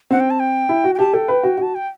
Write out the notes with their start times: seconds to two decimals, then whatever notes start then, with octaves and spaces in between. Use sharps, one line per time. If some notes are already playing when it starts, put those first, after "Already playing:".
0.11 C4 F#5
0.20 G5
0.30 A5
0.40 G5
0.69 E4
0.84 F#4
0.95 G5
0.99 G4 A5
1.13 A4 G5
1.28 B4
1.43 F#4
1.57 F#4 A5
1.75 G5